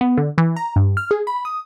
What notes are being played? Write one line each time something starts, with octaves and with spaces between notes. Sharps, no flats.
B3
D3
E3
A#5
G2
F6
G#4
B5
D#6